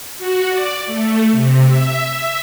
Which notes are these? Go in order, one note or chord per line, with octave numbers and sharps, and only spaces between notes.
F#4
D5
A3
C3
E5
E5